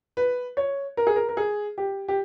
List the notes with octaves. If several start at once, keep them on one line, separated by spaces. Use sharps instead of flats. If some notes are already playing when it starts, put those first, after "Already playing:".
B4
C#5
A#4
G#4
A#4
A#4
G#4
G4
G4